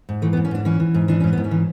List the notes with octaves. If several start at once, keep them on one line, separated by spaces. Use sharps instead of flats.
G#2
E3 A3
B3
G#2
C#4
G#2 D4
E3 C#4
E3
G#2
E3 D4
G#2 C#4
G#2 B3
C#4
E3